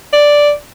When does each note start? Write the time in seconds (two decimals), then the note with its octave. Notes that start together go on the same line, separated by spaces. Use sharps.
0.13 D5